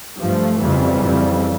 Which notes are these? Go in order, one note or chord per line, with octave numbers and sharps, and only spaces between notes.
G2 F3 A3
F2 C#3 E3 G3
F2 C#3